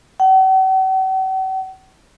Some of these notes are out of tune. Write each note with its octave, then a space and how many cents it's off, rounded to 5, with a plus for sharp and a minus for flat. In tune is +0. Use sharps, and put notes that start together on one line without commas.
F#5 +45